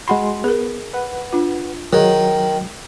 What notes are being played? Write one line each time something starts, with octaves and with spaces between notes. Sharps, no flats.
G#3 F#4 F#5 B5 C6
B3 G#4 A#4
B4 F#5
D4 F4
D#3 F#3 G#4